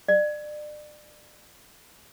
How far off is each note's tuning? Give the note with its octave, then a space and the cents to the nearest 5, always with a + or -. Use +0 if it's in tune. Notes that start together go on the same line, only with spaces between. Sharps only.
D5 +30